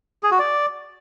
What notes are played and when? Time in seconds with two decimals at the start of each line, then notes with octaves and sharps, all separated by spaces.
0.23 G#4
0.31 F#4
0.39 D5